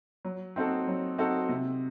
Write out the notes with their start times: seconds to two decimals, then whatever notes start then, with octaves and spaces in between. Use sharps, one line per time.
0.25 F#3
0.56 C4 D#4 F#4 A4
0.88 F#3
1.18 C4 D#4 F#4 A4
1.49 C3